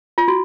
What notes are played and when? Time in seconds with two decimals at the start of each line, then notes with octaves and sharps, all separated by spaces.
0.18 F4
0.28 F#4